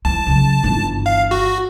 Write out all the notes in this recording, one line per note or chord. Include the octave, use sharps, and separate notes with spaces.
E3 A5
C#3 F#3
G1 E3
F5
F#4